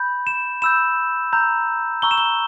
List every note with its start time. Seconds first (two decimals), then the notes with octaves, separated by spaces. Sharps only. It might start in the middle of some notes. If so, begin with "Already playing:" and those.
Already playing: B5 G6
0.27 E7
0.62 B5 E6 G6 E7
1.33 A#5 E6 G6
2.02 A#5 C#6 E6 G7
2.11 E7
2.18 G7